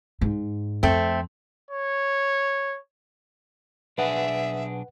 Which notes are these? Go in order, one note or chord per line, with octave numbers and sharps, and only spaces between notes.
G#2
F2 A3 C4
C#5
B1 D4 G#4 B4 E5 F#5